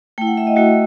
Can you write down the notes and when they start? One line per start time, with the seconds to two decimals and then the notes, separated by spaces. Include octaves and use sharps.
0.18 A3 E4 G5
0.27 F#5
0.37 E5
0.47 D#5
0.56 A3 E4 F#4